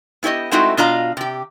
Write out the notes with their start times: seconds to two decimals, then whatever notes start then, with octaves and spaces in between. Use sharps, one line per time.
0.23 B3 E4 G4 C#5 D#5
0.51 G#3 A3 C4 D#4 E4 F#4
0.77 B2 D4 F4 D#5 F5 A#5
1.17 C3 G4